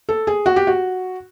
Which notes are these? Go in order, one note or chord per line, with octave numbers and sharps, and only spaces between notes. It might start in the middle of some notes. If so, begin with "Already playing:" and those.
A4
G#4
F#4
G4
F#4